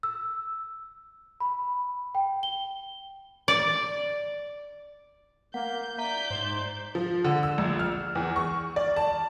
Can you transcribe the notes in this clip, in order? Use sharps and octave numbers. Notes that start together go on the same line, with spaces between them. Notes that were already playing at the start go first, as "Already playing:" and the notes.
E6
B5
G5
G7
D5
A#3 F#5 G6
D5 E5 A#5 G6 B6
G#2 C5
F3
D3
E6
A#1
F6
E2
C#6
D5
A5